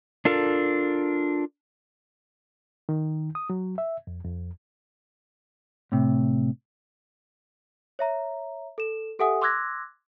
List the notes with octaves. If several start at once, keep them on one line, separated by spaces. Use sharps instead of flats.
D4 F4 A4 A#4
D#3
D#6
F#3
E5
F2
F2
A2 C3
C#5 E5 A#5
A4 E7
G4 A4 E5 F#5 G#5 D#6
C6 D6 E6 F#6 G#6 A#6